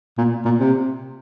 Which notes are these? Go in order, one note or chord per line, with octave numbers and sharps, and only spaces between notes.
A#2
A#2
C3